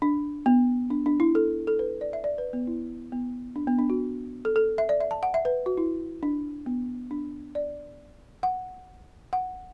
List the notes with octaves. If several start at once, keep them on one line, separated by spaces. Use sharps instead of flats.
D4
B3
D4
D4
E4
A4
A4
B4
D5
E5
D5
B4
B3
E4
B3
D4
B3
D4
F#4
A4
A4
E5
D5
E5
A5
F#5
E5
B4
F#4
E4
D4
B3
D4
D5
F#5
F#5